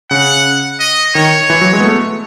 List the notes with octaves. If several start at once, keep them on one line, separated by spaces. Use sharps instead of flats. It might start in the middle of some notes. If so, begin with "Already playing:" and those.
C#3 F#5
D#5
D#3 C#5
E3
F#3
G#3
B3
A3